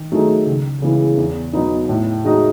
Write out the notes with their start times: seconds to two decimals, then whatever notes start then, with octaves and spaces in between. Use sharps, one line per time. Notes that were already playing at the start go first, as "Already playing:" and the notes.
Already playing: D#3
0.12 F#3 A3 D#4 G#4
0.47 C#2
0.82 C#3 E3 G#3 B3
1.17 E2
1.53 B2 F#3 B3 D#4
1.89 A2
2.24 G#3 D#4 F#4